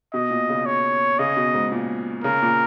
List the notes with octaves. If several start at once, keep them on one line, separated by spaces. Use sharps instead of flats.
B2 D#5
A#2
C#3
C#5
C#3 D#5
B2
G#2
A#2
C#3 A#4
A#2